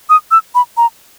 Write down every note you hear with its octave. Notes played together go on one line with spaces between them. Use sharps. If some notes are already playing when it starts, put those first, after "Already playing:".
D#6
E6
B5
A#5